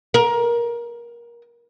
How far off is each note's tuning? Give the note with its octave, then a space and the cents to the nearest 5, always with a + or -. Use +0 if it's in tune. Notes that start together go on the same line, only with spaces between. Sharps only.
A#4 +20